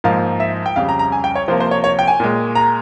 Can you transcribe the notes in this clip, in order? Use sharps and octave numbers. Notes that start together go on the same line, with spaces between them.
G#2 F3 A#3 F5
E5
G5
F2 C#3 G3 F5
A#5
A#5
G#5
G5
C#5
C3 F3 A#3 C5
C5
C#5
C#5
G5
G#5
A#2 G#3
A#5